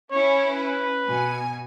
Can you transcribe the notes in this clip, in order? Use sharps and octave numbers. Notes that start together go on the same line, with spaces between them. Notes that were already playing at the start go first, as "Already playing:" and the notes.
C#4 E4 C#5
B4
B2 G#5